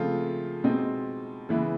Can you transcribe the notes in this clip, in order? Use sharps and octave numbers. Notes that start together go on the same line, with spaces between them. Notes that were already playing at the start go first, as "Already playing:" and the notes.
Already playing: C#3 F3 A3 C4 F4
B2 G#3 C4 D#4
C#3 E3 G#3 B3 E4